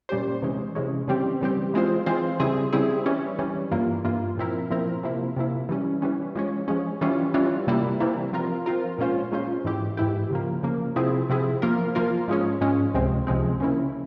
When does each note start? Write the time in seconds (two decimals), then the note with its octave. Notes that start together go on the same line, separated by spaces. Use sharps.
0.09 A#2 G3 C#4 G4 C5
0.42 C3 E3 G#3 C#4
0.75 C3 E3 G#3 C#4
1.08 C#3 E3 G3 C4 G4
1.41 C#3 E3 G3 C4 G4
1.74 E3 G#3 C4 F4 C5
2.06 E3 G#3 C4 F4 C5
2.40 C#3 G3 C4 E4 G#4
2.73 C#3 G3 C4 E4 G#4
3.06 E3 G3 C#4
3.39 E3 G3 C#4
3.71 G2 E3 A#3 F4
4.05 G2 E3 A#3 F4
4.37 A#2 F3 C4 E4 A#4
4.70 A#2 F3 C4 E4 A#4
5.03 C3 F3 A#3 E4
5.36 C3 F3 A#3 E4
5.69 E3 G3 C#4
6.02 E3 G3 C#4
6.35 F3 G#3 C#4
6.68 F3 G#3 C#4
7.01 E3 G3 C#4 F4
7.34 E3 G3 C#4 F4
7.67 C3 E3 G3 A#3 E4
8.00 C3 E3 G3 A#3 E4
8.33 F3 C4 F4 A#4
8.66 F3 C4 F4 A#4
8.98 A#2 G#3 C#4 F4 C5
9.32 A#2 G#3 C#4 F4 C5
9.64 G#2 E3 G#3 E4 G4
9.97 G#2 E3 G#3 E4 G4
10.31 C#3 F3 A#3
10.63 C#3 F3 A#3
10.96 C3 F3 C4 E4 G#4
11.30 C3 F3 C4 E4 G#4
11.62 F3 A#3 F4 A#4
11.95 F3 A#3 F4 A#4
12.28 G#2 F3 G#3 C#4
12.61 G#2 F3 G#3 C#4
12.94 C#2 C3 F3 G#3 C4
13.27 C#2 C3 F3 G#3 C4
13.60 C#3 F3 A#3 C#4 E4